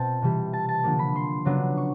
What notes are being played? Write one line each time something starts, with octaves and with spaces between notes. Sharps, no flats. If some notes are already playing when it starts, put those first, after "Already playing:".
Already playing: B2 C4 F4 G5 A5
C3 E3 G3
A5
A5
D3 F3 A#3
B5
C6
C#3 F#3 B3 D4
C#6